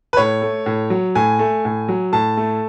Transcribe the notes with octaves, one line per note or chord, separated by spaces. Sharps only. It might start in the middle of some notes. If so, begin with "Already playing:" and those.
B4
A2 C#5
A3
A2
F#3
A2 G#5
A3
A2
F#3
A2 A5
A3